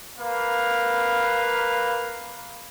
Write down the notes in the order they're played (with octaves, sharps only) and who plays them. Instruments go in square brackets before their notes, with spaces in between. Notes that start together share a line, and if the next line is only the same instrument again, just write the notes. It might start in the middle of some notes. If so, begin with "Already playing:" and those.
[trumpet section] A#3 B4 F5